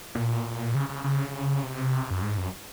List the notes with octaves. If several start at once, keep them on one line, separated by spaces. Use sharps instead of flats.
A#2
C#3
C#3
C#3
C3
F#2
G#2
F#2